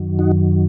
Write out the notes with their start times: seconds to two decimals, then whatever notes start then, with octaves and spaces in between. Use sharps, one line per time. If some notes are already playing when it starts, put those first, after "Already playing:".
Already playing: F#2 D#3 F#3
0.19 D#4 F#4